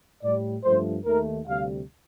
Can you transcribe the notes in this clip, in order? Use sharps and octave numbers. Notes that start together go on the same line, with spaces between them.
A2 G3 D5
G2 F3 A3 C5
D#2 D#3 A3 A#4
D2 C3 G3 F5